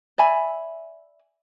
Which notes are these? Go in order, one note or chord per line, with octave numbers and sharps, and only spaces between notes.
D5 E5 G#5 B5